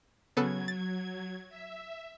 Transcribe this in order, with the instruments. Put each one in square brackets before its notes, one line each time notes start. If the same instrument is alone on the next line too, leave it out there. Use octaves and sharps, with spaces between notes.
[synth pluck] C#3 B3 A4 [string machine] F#3 G#6
[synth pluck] A6
[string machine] E5